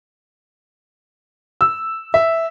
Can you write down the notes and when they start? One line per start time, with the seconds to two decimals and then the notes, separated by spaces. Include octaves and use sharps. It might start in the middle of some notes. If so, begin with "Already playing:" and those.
1.61 E6
2.14 E5